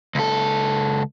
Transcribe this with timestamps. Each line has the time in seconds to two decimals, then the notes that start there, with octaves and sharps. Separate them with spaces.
0.15 C#2 A4